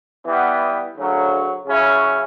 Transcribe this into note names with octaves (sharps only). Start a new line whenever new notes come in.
E3 G3 B3
D2 C#3 F#3
C#3 F#3 C#4 E4